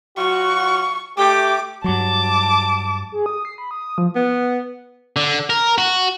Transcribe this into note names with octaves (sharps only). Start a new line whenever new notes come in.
F#3 F4 F#4 C#6
A3 G4 D6
G2 F#3 A5 D6
G#4
D#6
C7
B5
D#6
D#6
F3
B3
D3
A#4
F#4